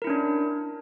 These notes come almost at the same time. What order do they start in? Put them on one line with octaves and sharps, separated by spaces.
A#4 E4 C#4 D4